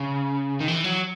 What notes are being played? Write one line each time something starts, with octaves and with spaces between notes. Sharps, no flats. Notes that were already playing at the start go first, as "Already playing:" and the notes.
Already playing: C#3
D#3
E3
F#3